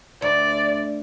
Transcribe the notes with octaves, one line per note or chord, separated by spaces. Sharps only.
D2 D5